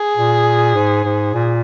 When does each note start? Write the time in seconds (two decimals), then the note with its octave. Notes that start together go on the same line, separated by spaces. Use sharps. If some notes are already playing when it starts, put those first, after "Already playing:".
Already playing: G#4
0.17 A#2
0.75 G#2
1.05 G#2
1.34 A#2